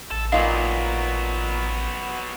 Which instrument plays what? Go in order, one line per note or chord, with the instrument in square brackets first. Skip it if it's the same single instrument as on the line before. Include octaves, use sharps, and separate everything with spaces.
[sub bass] A1 [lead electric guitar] A4
[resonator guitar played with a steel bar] A#2 D#4 [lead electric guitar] F#3 B3 [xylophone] F5